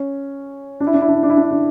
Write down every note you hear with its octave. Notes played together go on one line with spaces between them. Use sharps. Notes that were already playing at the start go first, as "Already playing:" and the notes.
Already playing: C#4
D4
E4
D4
E4
D4
E4
D4
E4
D4
E4
D4